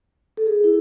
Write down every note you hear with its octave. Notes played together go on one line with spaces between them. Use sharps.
A4
G#4
E4